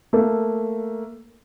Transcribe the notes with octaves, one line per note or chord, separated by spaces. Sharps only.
A3 A#3